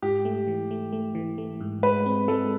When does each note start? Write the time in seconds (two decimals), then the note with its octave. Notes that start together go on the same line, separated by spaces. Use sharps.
0.02 G#2 G4
0.25 A3
0.48 E3
0.71 A3
0.92 A3
1.15 E3
1.38 A3
1.61 G#2
1.83 G#3 B4
2.06 C4
2.28 G#3 A4